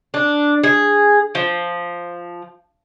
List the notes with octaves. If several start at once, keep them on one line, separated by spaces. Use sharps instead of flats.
D4
G#4
F3